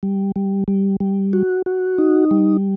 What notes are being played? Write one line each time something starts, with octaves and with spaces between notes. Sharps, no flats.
G3
G3
G3
G3
F#4
F#4
D#4
G3